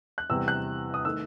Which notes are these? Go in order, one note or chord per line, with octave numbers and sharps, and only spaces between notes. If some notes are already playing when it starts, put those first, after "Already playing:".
F#6
E2 C3 E3 G3 E6
F#6
D#6
D#3 A3 E6